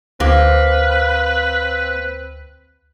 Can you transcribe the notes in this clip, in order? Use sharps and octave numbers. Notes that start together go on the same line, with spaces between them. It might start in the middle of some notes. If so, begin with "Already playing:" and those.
D2 A#3 C4 B4